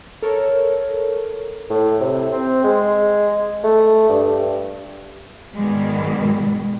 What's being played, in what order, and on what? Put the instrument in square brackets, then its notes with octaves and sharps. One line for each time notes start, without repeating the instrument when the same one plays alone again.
[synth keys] A4 A#4 C#5
[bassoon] A2
C3
C4
G#3
A3
G2
[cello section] G#2 B2 D#3 G3 G#3 B3